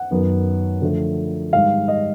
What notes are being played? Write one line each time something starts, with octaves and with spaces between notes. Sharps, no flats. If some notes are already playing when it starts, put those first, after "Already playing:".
Already playing: F#5
F#2 D#3 F#3 B3
D3 F3 A3
G#2 D#3 G3 F5
D#5